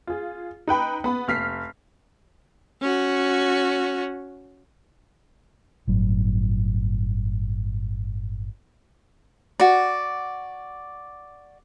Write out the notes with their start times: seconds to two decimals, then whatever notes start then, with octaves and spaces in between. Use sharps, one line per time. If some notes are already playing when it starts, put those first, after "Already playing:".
0.07 F4 G#4
0.67 D#4 B4 G5 B5
1.04 B3 B5
1.28 F1 F6 B6 C7
2.81 C#4 F#4
5.87 G1 A2 F#3
9.60 F#4 D5